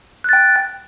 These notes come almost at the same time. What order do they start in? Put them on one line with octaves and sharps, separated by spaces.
F#6 A6 G5